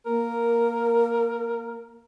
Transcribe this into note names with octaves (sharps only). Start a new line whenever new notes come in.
A#3 A#4